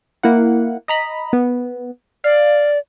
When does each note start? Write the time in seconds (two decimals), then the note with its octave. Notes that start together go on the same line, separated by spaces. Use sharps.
0.23 A#3 E4 F#5
0.88 D#5 A#5 B5
1.33 B3
2.24 D5 F5